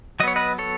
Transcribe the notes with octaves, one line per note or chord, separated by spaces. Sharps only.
F#3 B3 C#5 D#5
B4 D#5
A4 C#5